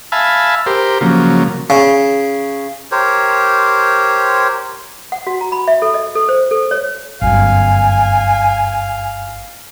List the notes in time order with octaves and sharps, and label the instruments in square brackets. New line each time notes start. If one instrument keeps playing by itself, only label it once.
[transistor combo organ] E5 F5 G#5 A5 B5
G4 A#4 C5
C#3 F3 F#3 A#3
[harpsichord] C#3
[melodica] G4 A#4 C5 C#5
[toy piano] F#5
F#4
A#5
B5
E5
A4
D#5
A4
C5
A4
C#5
[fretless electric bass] G1 F#2 [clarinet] F5 [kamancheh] G#5